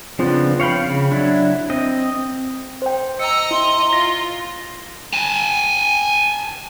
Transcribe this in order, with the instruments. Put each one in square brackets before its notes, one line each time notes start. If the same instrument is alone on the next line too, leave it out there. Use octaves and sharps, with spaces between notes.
[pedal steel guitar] C#3 F3 B3 C4 D4
C#5 F5 G5 B5
C#3
F#3 D4 E4
C4 D#5
[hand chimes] C5 G5
[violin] D#5 A#5 [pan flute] E6 [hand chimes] C#7
[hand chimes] E4 [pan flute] C6
[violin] F4 [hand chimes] A#6
[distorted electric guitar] G#5 A5